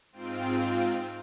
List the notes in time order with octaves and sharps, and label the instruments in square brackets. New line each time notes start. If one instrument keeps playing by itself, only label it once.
[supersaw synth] G#2 C4 F4 D7